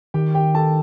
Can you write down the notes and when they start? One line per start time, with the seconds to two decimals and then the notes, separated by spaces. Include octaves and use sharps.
0.14 D#3 G4 G5
0.35 G4 G5
0.55 A4 A5